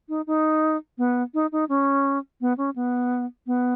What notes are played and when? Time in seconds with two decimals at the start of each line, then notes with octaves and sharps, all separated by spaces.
0.09 D#4
0.27 D#4
0.98 B3
1.34 D#4
1.52 D#4
1.69 C#4
2.41 B3
2.58 C#4
2.76 B3
3.47 B3